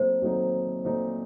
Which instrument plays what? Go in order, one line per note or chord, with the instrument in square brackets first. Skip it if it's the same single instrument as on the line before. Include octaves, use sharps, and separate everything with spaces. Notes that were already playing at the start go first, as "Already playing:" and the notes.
Already playing: [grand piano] A#2 F#3 A3 C4 D#4 [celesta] C5
[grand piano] A#2 F#3 A3 C4 D#4
A#2 F#3 A3 C4 D#4